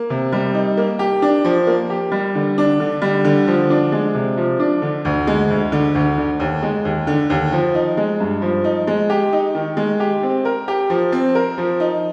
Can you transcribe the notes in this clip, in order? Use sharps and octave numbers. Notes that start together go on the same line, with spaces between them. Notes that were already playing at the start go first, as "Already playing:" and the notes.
Already playing: A#3
C3
G3
D#4
A#3
G4
D4
F3
A#3
G4
G3
D3
D4
D3
G3
D3
F3
D4
G#3
C3
F3
D4
D3
D2
G#3
D2
D3
D2
D3
D#2
G#3
D#2
D3
D#2
F3
D#4
G#3
G2
F3
D#4
G#3
G4
D#4
D#3
G#3
G4
C4
A#4
G4
F3
C4
A#4
F3
D#4